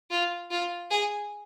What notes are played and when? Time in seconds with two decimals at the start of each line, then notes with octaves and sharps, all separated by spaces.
0.10 F4
0.51 F4
0.91 G#4